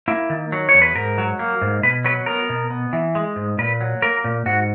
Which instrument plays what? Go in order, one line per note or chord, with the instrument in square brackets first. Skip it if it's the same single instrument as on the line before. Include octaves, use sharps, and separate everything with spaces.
[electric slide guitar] A#3 E4
D#3
F#3
C#5
E2
B4
G#2 A#4
F#3
A#3
G#2
B2 B4
F#3 B4
B3 A#4
B2
B3
E3
G#3
G#2
A#2 B4
F#3
A#3 A#4
A#2
G#2 F#4